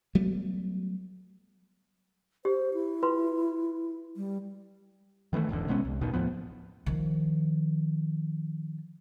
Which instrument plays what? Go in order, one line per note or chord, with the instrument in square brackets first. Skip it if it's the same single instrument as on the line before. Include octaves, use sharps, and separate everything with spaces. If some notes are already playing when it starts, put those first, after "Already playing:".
[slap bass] F#3 G3 A3 B3
[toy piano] G4 [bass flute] C5
[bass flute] E4
[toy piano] F4 B4 C6
[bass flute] G3
[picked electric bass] D#3 E3 G#3 A3
D#1 G#1 E2 D3
B2 G#3 B3 C#4
C2
A#1 D#2 B2 D#3
D#2 A2 F3 B3
[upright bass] D#3 F3